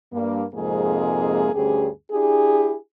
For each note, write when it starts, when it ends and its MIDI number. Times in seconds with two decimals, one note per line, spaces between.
0.12 0.44 43
0.12 0.44 58
0.55 1.51 41
0.55 1.51 44
0.55 1.51 48
0.55 1.51 56
0.55 1.51 58
0.55 1.51 68
1.54 1.89 38
1.54 1.89 43
1.54 1.89 61
1.54 1.89 67
1.54 1.89 68
2.12 2.76 62
2.12 2.76 64
2.12 2.76 67
2.12 2.76 68